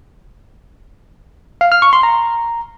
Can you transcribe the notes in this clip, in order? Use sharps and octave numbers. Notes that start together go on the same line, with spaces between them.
F5
F6
C#6
C6
A#5